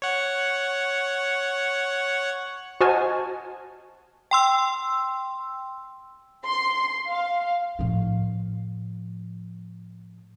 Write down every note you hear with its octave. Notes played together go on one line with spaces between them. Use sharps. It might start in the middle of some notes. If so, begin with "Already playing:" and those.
C#5 F#5
F#4 C5 D#5 G#5 A5 F6
G5 C6 E6
C6
F5
A2 F3